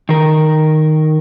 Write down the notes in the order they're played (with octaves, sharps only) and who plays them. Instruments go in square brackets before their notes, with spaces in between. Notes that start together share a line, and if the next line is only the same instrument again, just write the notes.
[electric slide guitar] D#3 A#4